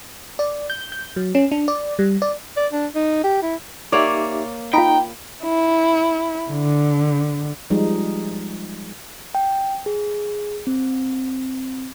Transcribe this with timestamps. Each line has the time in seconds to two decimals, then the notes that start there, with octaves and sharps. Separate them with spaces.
0.39 D5
0.70 G6
0.92 G6
1.16 F#3
1.35 C#4
1.51 D4
1.68 D5
1.99 G3
2.22 D5
2.57 D5
2.73 D4
2.95 D#4
3.24 G4
3.42 E4
3.92 A#3 D#4 G4 C#5 D5 E5
4.73 D#4 F4 G5 A#5 B5
5.44 E4
6.52 D3
7.70 F3 G3 G#3 D#4
9.35 G5
9.86 G#4
10.67 C4